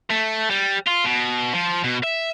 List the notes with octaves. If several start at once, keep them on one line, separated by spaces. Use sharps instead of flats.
A3
G3
F4
B2
F3
B2
E5